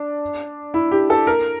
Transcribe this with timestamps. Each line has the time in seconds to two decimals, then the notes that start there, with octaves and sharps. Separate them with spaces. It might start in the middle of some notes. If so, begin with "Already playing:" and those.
Already playing: D4
0.74 E4
0.91 G4
1.10 A4
1.27 A#4